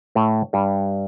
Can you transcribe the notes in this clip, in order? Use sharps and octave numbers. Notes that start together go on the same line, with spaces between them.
A2 A3
G2 G3